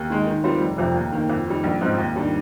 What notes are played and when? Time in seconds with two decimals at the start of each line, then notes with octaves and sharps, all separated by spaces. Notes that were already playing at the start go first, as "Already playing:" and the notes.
Already playing: D#2
0.10 D#3 G#3
0.27 D#3
0.44 G3 C4 F4 C5
0.61 F1
0.78 F2 C3 F3
0.95 D#2
1.12 D#3 A#3
1.30 F2
1.47 D#3 G3
1.64 A#1
1.81 G#2 F3 C4 D#4
1.98 D#2
2.15 D#3 G3 D4